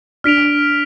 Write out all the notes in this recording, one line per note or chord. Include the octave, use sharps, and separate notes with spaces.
D4 F6 B6 D7 F7